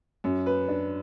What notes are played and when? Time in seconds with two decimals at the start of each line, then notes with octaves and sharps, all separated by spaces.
0.24 F#2
0.46 B4
0.68 D4